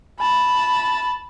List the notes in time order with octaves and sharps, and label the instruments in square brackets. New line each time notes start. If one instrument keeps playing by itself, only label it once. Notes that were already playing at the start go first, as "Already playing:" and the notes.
[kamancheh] A5 B5